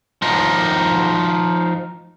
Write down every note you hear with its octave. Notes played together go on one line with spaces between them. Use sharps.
F3 D#4